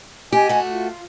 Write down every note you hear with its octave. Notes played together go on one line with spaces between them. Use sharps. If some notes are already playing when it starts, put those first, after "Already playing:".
G4 D#5 G#5
A3 F#4
F4